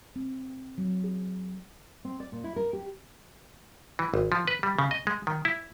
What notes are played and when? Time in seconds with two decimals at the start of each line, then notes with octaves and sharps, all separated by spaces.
0.16 C4
0.78 F#3
1.04 G#4
2.05 C4
2.20 D5
2.32 A#2
2.44 E4
2.56 A#4
2.73 G4
3.99 E3
4.14 G#1
4.32 F3
4.48 B4
4.63 G3
4.79 C#3
4.91 D#5
5.07 G#3
5.27 D#3
5.45 E4